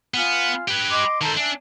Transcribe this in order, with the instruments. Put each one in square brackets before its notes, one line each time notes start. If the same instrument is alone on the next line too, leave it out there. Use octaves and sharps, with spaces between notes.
[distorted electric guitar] B3 [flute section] F4 G#5 F6
[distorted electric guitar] G4 B4
[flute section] D#5 C6 D6
[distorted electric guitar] D#3 C5 [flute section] A4 A5 A#5
[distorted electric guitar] D4 [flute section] E5 G#5